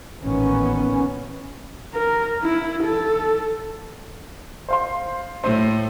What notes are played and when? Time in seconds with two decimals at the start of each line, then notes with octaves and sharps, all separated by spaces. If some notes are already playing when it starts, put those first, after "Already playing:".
0.23 A1 A#2 D#3 B3 C#4
1.95 A#4
2.43 E4
2.83 A4
4.69 C5 F5 C6
5.44 A2 C5